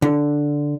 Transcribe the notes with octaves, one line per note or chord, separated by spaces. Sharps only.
D3